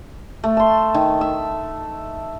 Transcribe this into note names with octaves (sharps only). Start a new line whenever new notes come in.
A3
A5 C6
D#3
E5